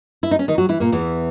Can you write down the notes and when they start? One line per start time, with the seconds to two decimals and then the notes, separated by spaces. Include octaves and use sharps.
0.23 E4
0.31 D#4
0.39 C#4
0.48 D#3 D#4
0.58 F#3 F#4
0.69 E3 E4
0.80 A#2 A#3
0.92 E2 E3